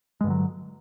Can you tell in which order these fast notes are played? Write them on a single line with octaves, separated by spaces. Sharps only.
G#3 G2 D3 F#3